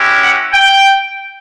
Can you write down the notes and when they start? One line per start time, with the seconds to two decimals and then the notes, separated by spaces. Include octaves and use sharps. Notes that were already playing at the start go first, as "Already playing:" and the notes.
Already playing: G#3 C#4 E4 G4
0.22 F#5
0.53 G5